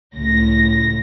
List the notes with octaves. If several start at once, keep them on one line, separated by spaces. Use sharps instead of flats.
C#2 A2 A#6